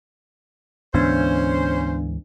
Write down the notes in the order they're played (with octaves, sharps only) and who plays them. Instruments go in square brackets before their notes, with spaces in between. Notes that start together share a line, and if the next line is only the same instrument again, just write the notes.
[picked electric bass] D2 G#2 E3 [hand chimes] B3 D4 [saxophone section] C#4 C5